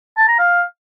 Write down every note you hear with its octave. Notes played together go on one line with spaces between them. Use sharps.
A5
A#5
F5